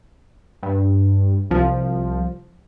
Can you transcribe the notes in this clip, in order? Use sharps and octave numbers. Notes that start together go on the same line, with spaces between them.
G2
C2 F3